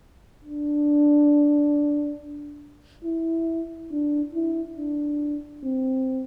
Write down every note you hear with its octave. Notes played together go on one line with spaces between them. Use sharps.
D4
E4
D4
E4
D4
C4